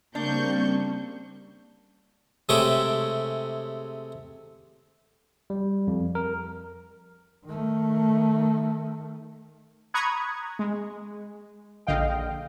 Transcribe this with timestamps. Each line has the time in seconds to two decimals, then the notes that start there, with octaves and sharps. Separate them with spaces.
0.15 C#3 G3 A#3 C4 D4 C#6 G6
2.49 C3 G#3 A3 G4 C#5 D6
5.50 G3
5.88 F2
6.15 A#4
7.45 D#3 A3
9.94 A#5 B5 C#6 D#6 F#6 G#6
10.59 G#3
11.87 A#1 D3 D#5 F5 G5